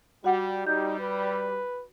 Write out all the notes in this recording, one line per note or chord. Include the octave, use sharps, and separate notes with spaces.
G3 F#4 F#5
G3 D#4 G6
B4